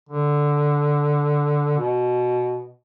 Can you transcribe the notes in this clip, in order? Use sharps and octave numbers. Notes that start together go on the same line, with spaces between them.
D3
B2